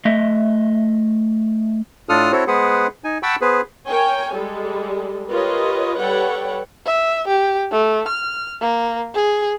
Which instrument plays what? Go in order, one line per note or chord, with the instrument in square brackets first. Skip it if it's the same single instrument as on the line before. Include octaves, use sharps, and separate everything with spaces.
[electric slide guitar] A3 D#5 E5
[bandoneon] A2 D4 F4 A4 D#6 F6
C4 E4 F#4 A4 C5 C#5
G#3 B3 G#4 B4 C5 F#5
D#4 G#5
F#5 G5 A5 B5 C#6 E6
B3 G#4 B4 C5
[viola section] A#4 C#5 G5 G#5
G3 G#3 A4
F4 G4 A#4 B4 C#5 D#5
G3 A4 B4 C#5 F#5 G5
[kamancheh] E5
G4
A3
F6
A#3
G#4